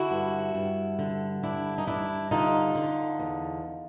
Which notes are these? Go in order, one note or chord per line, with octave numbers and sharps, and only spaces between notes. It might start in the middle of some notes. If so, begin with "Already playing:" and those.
Already playing: D3 E4 F#4
G2
G2
D3
G2 D4 E4
D#4
G2 D4 E4
D3 D#4 F4
D3
E2